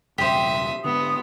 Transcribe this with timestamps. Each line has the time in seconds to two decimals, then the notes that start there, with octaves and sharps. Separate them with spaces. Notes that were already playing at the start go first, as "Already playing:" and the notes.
0.18 E1 G2 C#3 G4 C5 E5 D#6
0.84 G#2 D3 B3 D#6